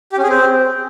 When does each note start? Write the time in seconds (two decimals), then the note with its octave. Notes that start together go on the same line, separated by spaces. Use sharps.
0.12 G4
0.18 C#4
0.23 G#4
0.29 C4